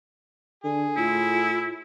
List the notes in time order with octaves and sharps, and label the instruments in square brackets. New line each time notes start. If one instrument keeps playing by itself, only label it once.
[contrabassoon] D3 [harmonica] G#4
[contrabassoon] A2 [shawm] E4 [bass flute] F4